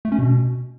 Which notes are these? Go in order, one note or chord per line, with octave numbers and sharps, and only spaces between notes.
A3
C#4
B2